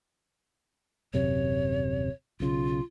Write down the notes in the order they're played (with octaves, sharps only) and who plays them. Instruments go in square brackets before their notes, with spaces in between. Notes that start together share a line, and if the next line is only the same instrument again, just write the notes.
[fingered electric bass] D#1 F#2 C3 [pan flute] C#5
[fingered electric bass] B1 C#3 [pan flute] F4